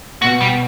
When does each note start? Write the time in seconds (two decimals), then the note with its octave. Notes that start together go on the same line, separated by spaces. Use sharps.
0.22 B2 F#4
0.41 G3